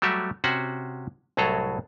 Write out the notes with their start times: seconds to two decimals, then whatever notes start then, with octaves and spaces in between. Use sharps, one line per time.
0.02 F#3 G3 A3 F#4 G4 E5
0.44 C3 C#4 F#4 C5 F#5
1.37 C2 A2 F#3 G#4 A4 A#5